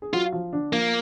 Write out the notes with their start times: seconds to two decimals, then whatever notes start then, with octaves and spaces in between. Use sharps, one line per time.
0.02 G#4
0.13 F#3 F4 F#4
0.32 F3 F4
0.53 D3 D4
0.73 F3 A#3 F4